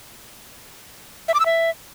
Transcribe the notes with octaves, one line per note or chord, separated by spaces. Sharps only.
E5
D6
E6
E5